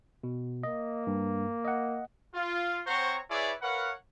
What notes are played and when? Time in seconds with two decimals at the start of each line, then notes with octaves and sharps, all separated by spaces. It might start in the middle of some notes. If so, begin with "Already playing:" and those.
0.23 B2
0.63 A#3 D#5
1.07 G2
1.65 D#5 F#5
2.35 F4
2.87 C4 C5 C#5 F#5 A#5 C#6
3.30 E4 G#4 B4 C#5 D5
3.62 A#4 B4 C#5 F5 F#5